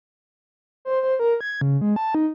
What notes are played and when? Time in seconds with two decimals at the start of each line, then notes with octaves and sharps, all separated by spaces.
0.85 C5
1.02 C5
1.19 A#4
1.41 G#6
1.61 C#3
1.81 G#3
1.96 A5
2.15 D#4